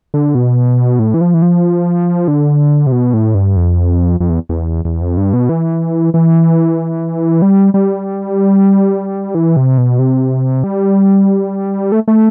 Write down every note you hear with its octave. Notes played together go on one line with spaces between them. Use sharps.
D3
B2
A2
E3
F3
E3
F3
D3
C3
B2
A2
G2
F2
F2
E2
E2
E2
F2
G2
B2
E3
E3
G3
G3
E3
C3
B2
C3
G3
A3
A3